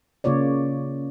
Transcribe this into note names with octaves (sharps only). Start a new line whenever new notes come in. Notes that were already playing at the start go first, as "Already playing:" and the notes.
C#3 A#3 F4 C#5 D5